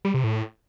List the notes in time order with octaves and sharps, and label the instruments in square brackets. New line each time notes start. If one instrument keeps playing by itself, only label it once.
[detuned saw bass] G3
C3
A2